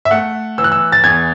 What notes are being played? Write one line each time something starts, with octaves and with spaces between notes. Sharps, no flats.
E5
A3 F#5
E3 E6
F#6
E6
A6
E2 G#6